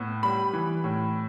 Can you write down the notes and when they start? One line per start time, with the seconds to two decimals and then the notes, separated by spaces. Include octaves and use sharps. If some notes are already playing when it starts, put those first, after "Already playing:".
Already playing: A2 B3
0.23 G3 B5
0.53 E3
0.84 A2